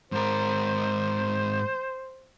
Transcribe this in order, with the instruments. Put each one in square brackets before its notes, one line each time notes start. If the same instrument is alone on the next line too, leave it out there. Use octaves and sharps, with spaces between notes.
[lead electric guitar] G#2 A#4 [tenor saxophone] C5